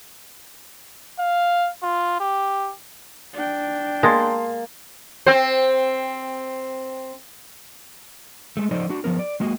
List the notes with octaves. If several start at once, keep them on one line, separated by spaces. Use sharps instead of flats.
F5
F4
G4
D4 G5
G#3 A#3 A5 C6 A6
C4 C5
G#3 A3
F3 D#4 A4 C5 D5 D#5
D4 F#4
F3 G3 B3 A#4
D5
G#3 A#3 F#4 D#5